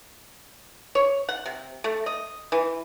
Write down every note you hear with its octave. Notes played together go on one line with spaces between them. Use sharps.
C#5
F#5
C3
A3
D#5
E3